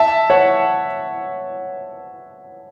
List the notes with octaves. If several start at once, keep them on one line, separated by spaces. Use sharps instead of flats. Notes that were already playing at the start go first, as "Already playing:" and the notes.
Already playing: E5 A5
C#5 F#5